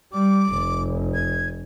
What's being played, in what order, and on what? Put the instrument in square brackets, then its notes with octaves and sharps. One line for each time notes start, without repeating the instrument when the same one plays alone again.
[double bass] G3 [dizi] D6
[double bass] F1
[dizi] G#6